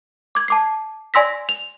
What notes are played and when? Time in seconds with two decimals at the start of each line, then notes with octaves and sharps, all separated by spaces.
0.35 D6 G#6
0.48 A5 D6 C7
1.14 D5 G#5 C6 E6 A#6 B6
1.49 F7